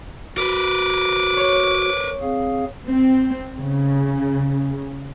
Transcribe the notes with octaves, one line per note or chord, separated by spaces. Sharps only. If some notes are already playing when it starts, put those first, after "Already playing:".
F#4 A#4 B4 D6
C#5
C4 G#4 F5
C4
C#3